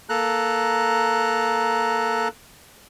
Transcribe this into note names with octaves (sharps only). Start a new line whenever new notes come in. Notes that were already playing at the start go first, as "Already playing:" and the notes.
A#3 A4 A#5 F#6